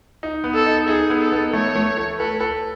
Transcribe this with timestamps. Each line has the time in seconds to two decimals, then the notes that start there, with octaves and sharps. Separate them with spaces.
0.23 D#4
0.44 B3
0.55 A4
0.66 D#4
0.88 D#4 G#4
1.10 B3
1.21 A4
1.32 B3
1.53 A3 C#5
1.75 A3
1.97 A3
2.19 A4 B4
2.41 A4